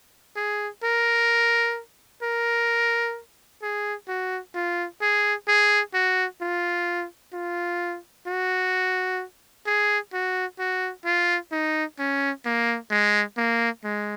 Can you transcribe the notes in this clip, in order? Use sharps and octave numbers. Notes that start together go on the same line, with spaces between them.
G#4
A#4
A#4
G#4
F#4
F4
G#4
G#4
F#4
F4
F4
F#4
G#4
F#4
F#4
F4
D#4
C#4
A#3
G#3
A#3
G#3